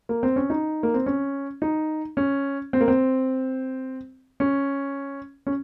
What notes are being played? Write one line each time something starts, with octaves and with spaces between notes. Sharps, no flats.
A#3
C4
C#4
D#4
A#3
C4
C#4
D#4
C#4
C4
A#3
C4
C#4
C#4